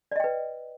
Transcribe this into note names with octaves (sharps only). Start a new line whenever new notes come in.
B4 D5 D#5 G5